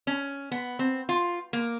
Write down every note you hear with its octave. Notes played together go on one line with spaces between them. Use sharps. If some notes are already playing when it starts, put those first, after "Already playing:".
C#4
B3
C4
F4
A#3